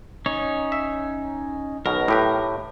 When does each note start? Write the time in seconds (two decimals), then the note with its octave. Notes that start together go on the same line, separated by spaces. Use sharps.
0.26 C#4 D#4 C#5
0.72 E5
1.86 B1 B2 A#4
2.08 A2 G4 B4